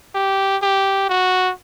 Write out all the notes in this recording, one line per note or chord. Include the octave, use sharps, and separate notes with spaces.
G4
G4
F#4